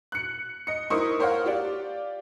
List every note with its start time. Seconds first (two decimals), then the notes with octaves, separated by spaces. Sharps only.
0.12 F#6 C#7
0.67 D#5 C#7
0.90 D#4 E4 A#4 C5 C#6 D#6
1.19 A#4 C5 C#5 F5 F#5
1.46 F4 G4 D5